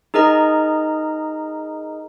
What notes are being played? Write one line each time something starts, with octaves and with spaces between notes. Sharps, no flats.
D#4 G#4 A#4 D#5 A#5